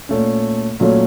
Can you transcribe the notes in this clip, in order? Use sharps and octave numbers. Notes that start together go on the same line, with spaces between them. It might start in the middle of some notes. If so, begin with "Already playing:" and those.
A#2 A3 C#4
A#2 F#3 A3 C#4